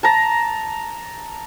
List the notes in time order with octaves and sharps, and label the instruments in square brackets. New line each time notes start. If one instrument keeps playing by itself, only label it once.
[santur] A5 A#5